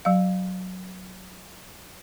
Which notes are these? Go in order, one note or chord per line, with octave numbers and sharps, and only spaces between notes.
F#3 F5